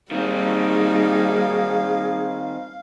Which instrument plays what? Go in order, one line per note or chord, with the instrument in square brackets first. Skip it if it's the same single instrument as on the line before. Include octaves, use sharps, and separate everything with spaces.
[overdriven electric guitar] D#3 C4 [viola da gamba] G3 A#3 D#4 [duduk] G#4 [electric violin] F5